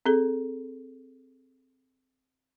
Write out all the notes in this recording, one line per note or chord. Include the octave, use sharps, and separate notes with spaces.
C4 G#4 A4